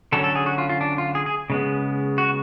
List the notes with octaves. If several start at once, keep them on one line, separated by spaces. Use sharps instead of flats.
D3 F#3 C#4 A4
A4
G#4
F#4
F4
F4
D4
F4
G#4
G#4
C#3 G#3 B3
F#4